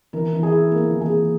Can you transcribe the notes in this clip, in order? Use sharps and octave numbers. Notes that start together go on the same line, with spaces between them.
E3 A#4
E3
G#4
E4
A#3 A#4
E3
G#4
E3